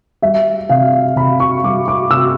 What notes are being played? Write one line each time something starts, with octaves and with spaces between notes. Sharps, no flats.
G3 E5
C3 F5
C3 B5
C#6
G3 D6
D6
C3 E6